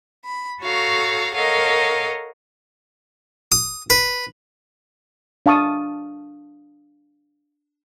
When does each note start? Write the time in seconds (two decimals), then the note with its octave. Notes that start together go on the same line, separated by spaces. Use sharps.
0.25 B5
0.62 F#4 A4 C#5 F5 A#5
1.35 A4 A#4 C#5 D#5 F5 F#5
3.52 D#6
3.90 B4
5.46 D4 F5 A5 C#6 D#6